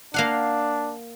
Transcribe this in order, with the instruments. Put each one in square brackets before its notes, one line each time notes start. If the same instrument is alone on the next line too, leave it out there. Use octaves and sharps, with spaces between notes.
[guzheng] A#3 F5 F#5 [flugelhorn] D4